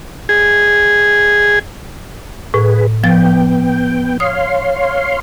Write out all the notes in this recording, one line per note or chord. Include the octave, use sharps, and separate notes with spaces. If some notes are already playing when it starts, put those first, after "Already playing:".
G#4
A2 G#4 B4
F3 B3 G5 A6
C#5 F5 C6 D#6